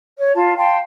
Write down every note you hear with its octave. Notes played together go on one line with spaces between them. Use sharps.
C#5
F4 A5
F5 G5 A5 C6